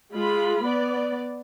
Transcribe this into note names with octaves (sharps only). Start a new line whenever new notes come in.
G#3 F4 B5
B3 D5